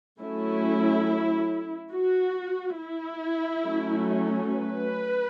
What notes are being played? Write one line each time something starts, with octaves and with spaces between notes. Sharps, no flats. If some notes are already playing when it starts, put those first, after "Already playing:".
F#3 A3 C#4 E4
F#4
E4
F#3 A3 C#4
B4